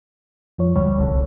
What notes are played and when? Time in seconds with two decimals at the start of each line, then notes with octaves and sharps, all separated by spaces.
0.58 F2 F3 C#5
0.76 D2 D3 G3 C#5
0.96 D1 C2 D3